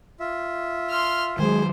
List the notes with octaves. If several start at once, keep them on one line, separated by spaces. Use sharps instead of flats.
F4 E5
C6 F6
D#3 F#3 G#3 C5 G#5 C6